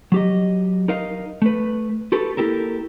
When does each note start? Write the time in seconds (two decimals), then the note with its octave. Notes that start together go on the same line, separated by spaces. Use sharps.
0.12 F#3 G4 D#5
0.88 D#4 A#4 D#5 F5
1.42 A3 B4
2.12 F#4 G4 A4 B4
2.37 A#3 E4 G4 A4 A#4